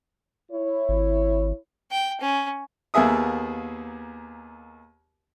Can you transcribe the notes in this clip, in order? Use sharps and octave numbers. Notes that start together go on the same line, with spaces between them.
E4 C#5
G#1
G5
C#4
D#2 A#3 B3 G#4 E5 D#6